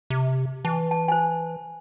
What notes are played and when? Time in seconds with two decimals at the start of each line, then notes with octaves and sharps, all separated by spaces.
0.10 C3
0.65 E3 A5
0.91 A5
1.08 C5 G#5